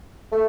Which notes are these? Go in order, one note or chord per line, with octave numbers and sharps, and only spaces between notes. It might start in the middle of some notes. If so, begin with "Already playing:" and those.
A3